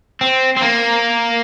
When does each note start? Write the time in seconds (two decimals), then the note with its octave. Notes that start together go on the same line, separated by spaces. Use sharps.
0.21 C4
0.56 C4
0.62 A#3